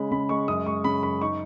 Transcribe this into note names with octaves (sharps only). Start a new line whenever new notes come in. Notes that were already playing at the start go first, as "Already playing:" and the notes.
Already playing: C#3 G#3 B5
C#3 B5
G#3 C#6
F#2 D#6
G#3 C#6
C#3 B5
F#2 B5
D#4 C#6